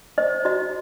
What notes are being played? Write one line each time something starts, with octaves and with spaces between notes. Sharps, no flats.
C5 D#5
F#4 D#5